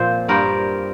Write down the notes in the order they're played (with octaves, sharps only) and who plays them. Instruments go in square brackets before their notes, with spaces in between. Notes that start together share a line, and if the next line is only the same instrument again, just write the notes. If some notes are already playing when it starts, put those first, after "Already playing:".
Already playing: [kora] A#2 F3 C4 C5
G2 G3 C4 A#4